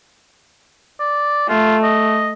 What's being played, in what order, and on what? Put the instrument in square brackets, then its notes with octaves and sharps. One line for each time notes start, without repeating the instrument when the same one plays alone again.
[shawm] D5
[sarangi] A3 [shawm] F4
[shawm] D#5